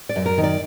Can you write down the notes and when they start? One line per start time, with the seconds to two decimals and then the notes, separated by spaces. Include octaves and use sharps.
0.09 D5
0.16 F#2
0.26 A#4
0.38 D#3
0.43 D5